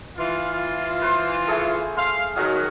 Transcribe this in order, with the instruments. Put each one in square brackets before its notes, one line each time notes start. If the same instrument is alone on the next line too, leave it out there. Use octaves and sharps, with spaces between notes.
[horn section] E3 F4
[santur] B4 C5 C6
A3 G#4 A4
[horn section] F5 [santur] C6
[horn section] D#3 F#3 [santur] F#4 G#4 F5